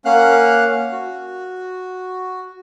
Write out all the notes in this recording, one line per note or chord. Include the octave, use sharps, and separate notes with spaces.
A#3 C#4 F5 F#5 F6 F#6
F#4